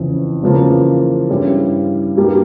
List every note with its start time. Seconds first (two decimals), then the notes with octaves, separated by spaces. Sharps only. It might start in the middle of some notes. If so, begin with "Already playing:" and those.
Already playing: F2 C#3 E3
0.43 E2 C#3 F3 A#3
1.29 G2 G3 C#4 E4
2.17 G2 G3 A#3